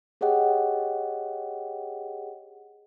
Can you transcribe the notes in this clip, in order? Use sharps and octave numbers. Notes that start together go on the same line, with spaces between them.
G4 G#4 C#5 D#5 F#5 G5